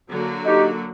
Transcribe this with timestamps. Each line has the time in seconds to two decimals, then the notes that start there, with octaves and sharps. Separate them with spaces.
0.09 D3 F#3 A#3 F#4
0.44 D#4 G4